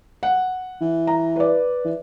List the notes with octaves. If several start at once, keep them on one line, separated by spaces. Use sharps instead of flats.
F#5
E3
A#5
B4 D5
E3